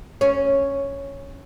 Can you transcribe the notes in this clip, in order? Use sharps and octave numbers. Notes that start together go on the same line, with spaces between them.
C#4